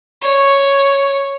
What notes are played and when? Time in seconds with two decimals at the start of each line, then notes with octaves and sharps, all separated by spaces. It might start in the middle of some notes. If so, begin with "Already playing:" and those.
0.22 C#5